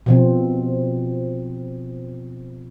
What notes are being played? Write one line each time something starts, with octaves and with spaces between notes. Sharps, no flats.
B2 F3 C4